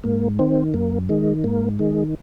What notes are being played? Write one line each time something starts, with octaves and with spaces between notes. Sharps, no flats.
G#2 A#3
D#3 C4
F#2 A#3
D#3 G#3
G#2 A#3
D#3 G#3